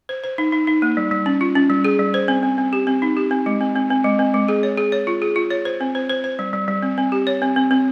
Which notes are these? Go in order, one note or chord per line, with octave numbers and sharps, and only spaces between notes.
C5
C5
D#4
D#4
D#4
A#3
G3
G3
C#4
F4
C#4
G3
G#4
G3
C5
C4
C4
C4
G4
C4
D#4
G4
C4
G#3
C4
C4
C4
G#3
C4
G#3
G#4
C#5
G#4
C#5
F4
G#4
F4
C#5
C5
C4
C5
C5
C5
G3
G3
G3
C4
C4
G4
C#5
C4
C4
C4